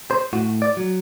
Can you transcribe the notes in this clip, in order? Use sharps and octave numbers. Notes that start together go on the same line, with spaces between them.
C5
A2 F#4
D5
F#3